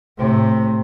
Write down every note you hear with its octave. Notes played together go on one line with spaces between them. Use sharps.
A2 C3